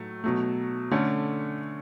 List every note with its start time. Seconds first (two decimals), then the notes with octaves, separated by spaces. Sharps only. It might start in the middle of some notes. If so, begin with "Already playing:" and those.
Already playing: A2 F#3 A3
0.24 B2 F#3 A3
0.91 D3 A3 C#4